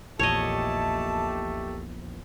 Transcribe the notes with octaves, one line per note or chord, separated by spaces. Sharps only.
A#1 E2 A#2 A3 G4 C#5 D#5 A5